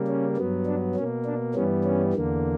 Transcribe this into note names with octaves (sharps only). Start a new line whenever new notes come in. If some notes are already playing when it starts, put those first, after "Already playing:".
Already playing: C#3 G3 A#3
C#4
G2 F#3 B3
D4
B2 A#3 C#4
D4
G2 E3 G3 B3 C#4
C#4
E2 D3 A#3